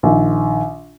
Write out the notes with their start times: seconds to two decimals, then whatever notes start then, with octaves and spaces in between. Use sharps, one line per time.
0.03 A#1 D#3